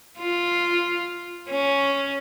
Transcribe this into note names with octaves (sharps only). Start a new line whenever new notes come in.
F4
C#4